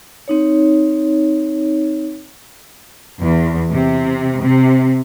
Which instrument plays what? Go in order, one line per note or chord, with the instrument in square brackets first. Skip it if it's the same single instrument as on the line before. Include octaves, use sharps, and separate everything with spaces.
[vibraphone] C4 D#4 C#5
[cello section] E2
C3
C3